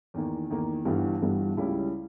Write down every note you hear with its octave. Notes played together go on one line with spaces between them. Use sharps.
E2 D#3 A#3
E2 D#3 A#3
G1 G2 E3 G3 B3
G1 G2 E3 G3 B3
C#2 C#3 G3 C#4 E4